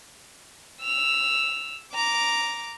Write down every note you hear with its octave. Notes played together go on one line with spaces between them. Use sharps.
E6 F7
A#5 D6